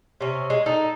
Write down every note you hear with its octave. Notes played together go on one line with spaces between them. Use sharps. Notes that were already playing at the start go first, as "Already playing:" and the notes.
C3 C#4
G#3
D#4 A4